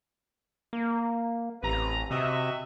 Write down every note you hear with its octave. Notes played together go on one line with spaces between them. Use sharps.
A#3
A1 C3 B4 A#5
C3 F#4 D#5 E5